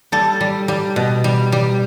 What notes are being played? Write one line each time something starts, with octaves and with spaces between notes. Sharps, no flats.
G3 A4
G3
G3
B2
G3
G3